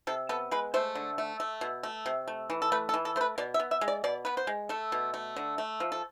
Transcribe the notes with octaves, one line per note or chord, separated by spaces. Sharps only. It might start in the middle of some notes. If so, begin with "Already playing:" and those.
C3 A4
B3 A4
G#3 B4
A3 C5
D3
A3
A3
B2
A3
C3
A3
E3
A4
A3 B4
A4
E3
A4
A3 B4 C5
B2 D5
E5
B3
E5
G#3
D5
B2 D5
B3 B4
C5
G#3
A3 A4
B2
A3
D3
A3
F3
A4